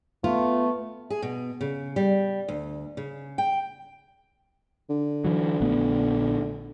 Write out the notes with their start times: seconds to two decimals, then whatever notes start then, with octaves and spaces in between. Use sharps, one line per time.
0.24 A3 B3 F4
1.10 G#4
1.22 B2
1.61 C#3
1.96 G3
2.48 D2
2.97 C#3
3.38 G5
4.90 D3
5.25 E3 F#3
5.61 A#1 A3 B3